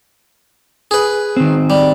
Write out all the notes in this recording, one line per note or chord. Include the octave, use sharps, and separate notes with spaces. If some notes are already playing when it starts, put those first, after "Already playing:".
G#4 B4
D#3 C4
G3